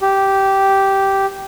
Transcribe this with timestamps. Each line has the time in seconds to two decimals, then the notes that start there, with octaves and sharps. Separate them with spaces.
0.01 G4